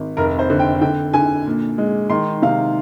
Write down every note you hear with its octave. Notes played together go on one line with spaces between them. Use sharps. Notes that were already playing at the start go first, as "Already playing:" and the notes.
Already playing: G#1
F1 A#4
C5
D3
G5
D3 G5
D3 G#5
A#2
G#3
D#3 C6
C3 F5